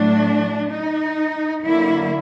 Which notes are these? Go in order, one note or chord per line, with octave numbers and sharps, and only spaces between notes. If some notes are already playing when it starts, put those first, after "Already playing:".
Already playing: A2 F#3 A3 D4
D#4
D3 F#3 A#3 E4